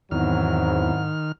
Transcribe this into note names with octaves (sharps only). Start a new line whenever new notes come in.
E2 G#2 D#3 F#3 C4 E4 F6